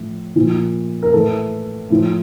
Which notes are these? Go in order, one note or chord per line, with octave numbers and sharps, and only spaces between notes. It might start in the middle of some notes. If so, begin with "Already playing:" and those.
Already playing: A2 F3
A#2 F3
A#4
A2 E3 A4
A2 F3